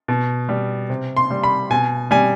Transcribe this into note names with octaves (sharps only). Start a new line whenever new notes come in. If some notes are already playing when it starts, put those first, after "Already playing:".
B2
G3
C3
C6
G3
B5
B2 G#5
G3 G#5